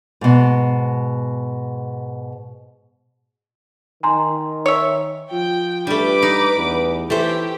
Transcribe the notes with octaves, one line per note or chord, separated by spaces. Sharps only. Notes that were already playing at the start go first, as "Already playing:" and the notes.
G#2 B2
D#3 G#5 A#5 C6
C#5 E5
F3 G5
G2 G3 A3 B4 D6
D#4
E2
E3 A3 G4 C5